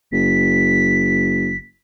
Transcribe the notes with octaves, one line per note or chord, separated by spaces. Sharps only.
F#1 B6